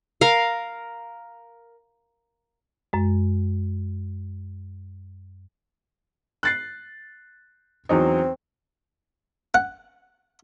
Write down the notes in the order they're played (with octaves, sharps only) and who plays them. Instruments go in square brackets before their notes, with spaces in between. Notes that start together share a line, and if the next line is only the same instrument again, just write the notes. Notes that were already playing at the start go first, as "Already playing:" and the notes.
[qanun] A#4 F5
[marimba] F#2 G#3
[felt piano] F#6 A6 C7
[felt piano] E2 F#3 D#4 [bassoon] C4
[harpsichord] F#5